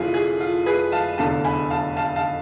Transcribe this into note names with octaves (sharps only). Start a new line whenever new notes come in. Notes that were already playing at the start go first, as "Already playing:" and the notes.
Already playing: F1 F2 E3 F4 G#4
G#4
F4
G#4 B4
F5 A5
F1 E2 D3 F5 A5
G#5 B5
F5 A5
F5 A5
F5 A5